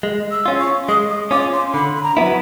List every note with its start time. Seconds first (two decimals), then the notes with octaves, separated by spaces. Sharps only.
0.03 G#3
0.31 E6
0.46 C#4 F4
0.60 C#6
0.89 G#3 D#6
1.09 D#6
1.31 C#4 F4 D6
1.53 C6
1.74 D3 B5
1.97 B5
2.03 A#5
2.17 F#3 B3 E4